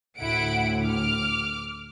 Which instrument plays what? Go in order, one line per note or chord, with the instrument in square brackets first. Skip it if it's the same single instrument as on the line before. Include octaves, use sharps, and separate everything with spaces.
[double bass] D2 A2 [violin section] E4 F#5 D7
[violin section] D6 F6